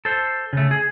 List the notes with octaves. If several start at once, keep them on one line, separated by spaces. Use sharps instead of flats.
A4 C5
C#3 A3
G#4